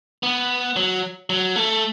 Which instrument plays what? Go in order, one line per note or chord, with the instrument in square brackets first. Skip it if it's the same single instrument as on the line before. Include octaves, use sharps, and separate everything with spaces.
[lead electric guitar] B3
F#3
F#3
A3